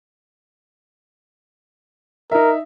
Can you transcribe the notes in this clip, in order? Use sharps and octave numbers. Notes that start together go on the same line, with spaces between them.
D#4 A#4 E5